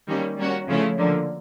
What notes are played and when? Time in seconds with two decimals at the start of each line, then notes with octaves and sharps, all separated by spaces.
0.08 D#3 G3 A#3 C#4
0.38 G3 A#3 C#4 F#4
0.68 C#3 F3 A3 C#4 E4
0.97 D3 F3 A#3